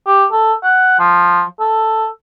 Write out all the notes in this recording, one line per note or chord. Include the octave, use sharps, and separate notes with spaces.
G4
A4
F#5
F3
A4